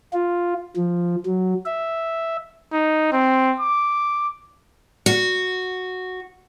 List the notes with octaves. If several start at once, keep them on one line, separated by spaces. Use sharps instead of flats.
F4
F3
F#3
E5
D#4
C4
D6
F#4